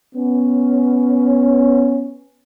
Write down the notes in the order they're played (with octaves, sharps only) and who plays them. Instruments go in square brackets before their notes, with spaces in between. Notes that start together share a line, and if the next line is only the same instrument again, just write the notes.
[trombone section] B3 C#4